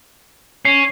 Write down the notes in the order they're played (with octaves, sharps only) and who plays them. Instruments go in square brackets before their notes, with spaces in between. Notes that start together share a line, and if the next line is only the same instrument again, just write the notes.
[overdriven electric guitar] C#4 [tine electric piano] C7